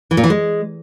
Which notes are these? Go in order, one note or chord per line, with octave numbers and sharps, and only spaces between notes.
E3
A#2
E3
G#3